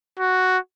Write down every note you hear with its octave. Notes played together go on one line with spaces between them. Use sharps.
F#4